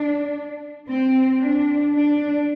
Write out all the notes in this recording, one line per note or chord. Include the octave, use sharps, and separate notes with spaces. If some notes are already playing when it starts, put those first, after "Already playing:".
Already playing: D4
C4
D4
D4